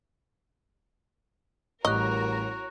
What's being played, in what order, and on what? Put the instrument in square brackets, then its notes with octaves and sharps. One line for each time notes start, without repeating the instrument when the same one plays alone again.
[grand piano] A1 G3 [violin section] F#4 A#4 C#5 [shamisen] D#5 [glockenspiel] C#6 F#6